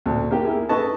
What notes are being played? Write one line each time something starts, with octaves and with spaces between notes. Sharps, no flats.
D2 A#2
A#3 G4
A#3 E4 G#4
A4 B4 D#5 A5 C#6